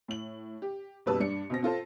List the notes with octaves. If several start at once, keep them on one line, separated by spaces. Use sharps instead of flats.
A2 F#7
G4
F#1 B2 G3 B4 A5 E6
G2 D4 C#7
B2 C4 A#6
C4 F4 A4 C5